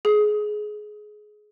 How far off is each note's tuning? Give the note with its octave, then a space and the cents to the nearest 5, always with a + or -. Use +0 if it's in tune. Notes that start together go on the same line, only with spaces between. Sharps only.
G#4 +20